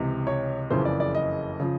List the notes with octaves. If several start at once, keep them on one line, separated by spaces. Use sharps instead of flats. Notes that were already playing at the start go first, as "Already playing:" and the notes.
Already playing: C#2 C3 E3
C#5
F#1 F2 C#3 E3 C5
D5
D5
D#5
C#3 F3